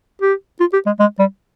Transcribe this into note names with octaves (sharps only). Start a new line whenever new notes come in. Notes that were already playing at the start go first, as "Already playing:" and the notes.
G4
F4
G4
G#3
G#3
G3